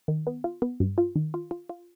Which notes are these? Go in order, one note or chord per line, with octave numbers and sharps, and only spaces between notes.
D#3
B3
F4
B3
G2
F4
D#3
F4
F4
F4